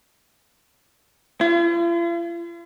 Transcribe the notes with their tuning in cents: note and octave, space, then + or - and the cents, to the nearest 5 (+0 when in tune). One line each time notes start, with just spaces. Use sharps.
F4 -45